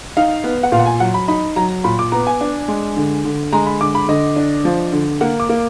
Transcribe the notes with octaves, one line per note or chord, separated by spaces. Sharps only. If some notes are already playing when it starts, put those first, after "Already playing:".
D#4 F5
B3
F#5
A#2 F5
F#5
G#5
F#3 F#5
B5
D#4 B5
F#3 A#5
A#2 B5
D6
B3 A#5
G#5
D4
G#3
D3
D3
G#3 A#5
B5
D3 D6
B5
D3 D#5
D4
F3
D3
A#3 F#5
D6
A#3